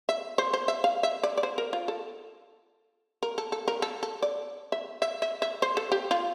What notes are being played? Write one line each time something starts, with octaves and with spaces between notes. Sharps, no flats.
E5
C5
C5
E5
F5
E5
D5
D5
C5
A#4
F4
A4
A#4
A4
A4
A#4
A4
A4
D5
E5
E5
E5
E5
C5
A4
G4
F4